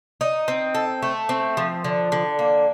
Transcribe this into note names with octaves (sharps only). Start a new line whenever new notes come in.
D#4
C4
A4
A3
C4
F3
D3
D3
A#3